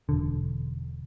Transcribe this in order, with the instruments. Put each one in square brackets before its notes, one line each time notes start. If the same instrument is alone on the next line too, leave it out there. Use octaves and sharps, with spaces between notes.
[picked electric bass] E1 D3